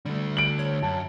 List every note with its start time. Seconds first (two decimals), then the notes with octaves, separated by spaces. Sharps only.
0.06 D3 G3 A3
0.37 D7 F#7
0.59 C#5
0.83 F#2 A5